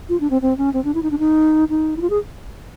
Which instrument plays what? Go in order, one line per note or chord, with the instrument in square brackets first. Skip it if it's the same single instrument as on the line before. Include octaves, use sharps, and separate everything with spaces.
[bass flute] F4
D4
C4
C4
C#4
C4
D4
E4
D#4
D4
D#4
D#4
E4
F4
G#4